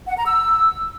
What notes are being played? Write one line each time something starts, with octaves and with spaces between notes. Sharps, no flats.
F#5
A#5
E6